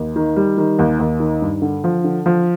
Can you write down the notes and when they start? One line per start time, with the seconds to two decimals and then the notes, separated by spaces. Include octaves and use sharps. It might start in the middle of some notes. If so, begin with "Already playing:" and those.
Already playing: D#2
0.16 D#3
0.36 G3
0.58 D#3
0.79 D#2
0.99 D#2
1.20 D#3
1.42 G2
1.62 D3
1.84 F3
2.04 D3
2.26 F3